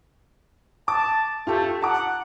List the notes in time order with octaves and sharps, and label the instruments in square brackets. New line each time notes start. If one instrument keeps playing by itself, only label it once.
[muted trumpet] A5 [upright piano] D6
[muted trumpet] A3 [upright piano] F4 G4 A4
[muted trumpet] F#5 [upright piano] A5 A#5 D6